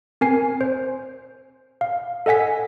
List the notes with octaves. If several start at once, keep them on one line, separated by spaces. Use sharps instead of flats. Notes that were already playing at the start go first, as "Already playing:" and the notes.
C4 A#4 G#5 C7
C5
F5
A4 D#5 F#5 G#5 B6